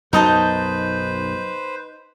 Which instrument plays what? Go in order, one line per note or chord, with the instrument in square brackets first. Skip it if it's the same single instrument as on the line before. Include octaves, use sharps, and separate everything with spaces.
[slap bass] B1 F#2 [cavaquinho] D#4 D#5 A5 [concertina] B4 C5